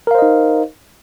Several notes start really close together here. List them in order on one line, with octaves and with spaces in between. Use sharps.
A#4 F5 C5 D#5 D#4